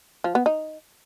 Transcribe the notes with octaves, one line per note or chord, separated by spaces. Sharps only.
F3
B3
D#4